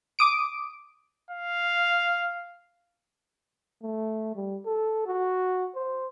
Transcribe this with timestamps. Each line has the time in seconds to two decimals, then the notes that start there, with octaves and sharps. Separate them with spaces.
0.19 D6 D#6 D7
1.30 F5
3.82 A3
4.35 G3
4.65 A4
5.06 F#4
5.75 C5